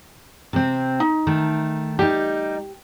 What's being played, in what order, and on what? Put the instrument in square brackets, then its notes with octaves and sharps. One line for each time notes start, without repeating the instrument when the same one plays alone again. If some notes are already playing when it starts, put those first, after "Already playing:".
[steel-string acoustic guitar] C3 C4
[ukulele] D#4
[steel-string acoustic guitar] D#3 A3
[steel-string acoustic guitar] G3 D#4 [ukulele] G4